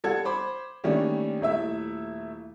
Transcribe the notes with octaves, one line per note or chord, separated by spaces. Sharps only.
G3 A4 F#5 G#6
C5 B5 D6
D#3 G3 A3 A#3 C#4 D4
D#1 A3 E4 E5